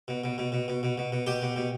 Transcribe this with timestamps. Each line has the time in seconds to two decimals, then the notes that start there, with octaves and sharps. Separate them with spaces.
0.08 B2
0.24 B2
0.38 B2
0.52 B2
0.68 B2
0.83 B2
0.98 B2
1.12 B2
1.27 B2 G4
1.42 B2
1.56 B2